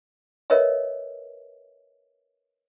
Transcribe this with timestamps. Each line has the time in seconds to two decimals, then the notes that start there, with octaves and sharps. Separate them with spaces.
0.50 A#4 B4 C#5 D#5 E5